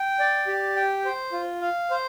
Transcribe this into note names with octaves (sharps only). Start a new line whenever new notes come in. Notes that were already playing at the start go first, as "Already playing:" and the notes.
Already playing: G5
D5
G4
G5
C5
F4
F5
C5